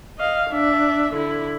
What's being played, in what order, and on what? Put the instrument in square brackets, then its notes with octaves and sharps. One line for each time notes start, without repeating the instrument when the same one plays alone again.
[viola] D#5 F5
D4 E5
D3 E4